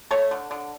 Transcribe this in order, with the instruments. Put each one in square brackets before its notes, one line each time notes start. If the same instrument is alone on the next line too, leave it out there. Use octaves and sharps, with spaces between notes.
[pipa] A3 A4 C#5
D3
D3